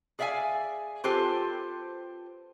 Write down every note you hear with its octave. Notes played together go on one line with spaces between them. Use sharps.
G#4 D5 E5 F5 G#5
C4 F4 G4 A4 B4 C5